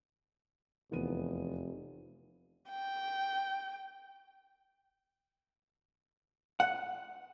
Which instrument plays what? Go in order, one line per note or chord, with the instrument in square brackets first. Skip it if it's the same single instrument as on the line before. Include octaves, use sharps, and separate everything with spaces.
[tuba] F1 [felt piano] E2 B3 D#7
[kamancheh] G5
[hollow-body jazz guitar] F#5